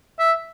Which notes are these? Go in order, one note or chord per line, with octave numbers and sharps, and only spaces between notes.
E5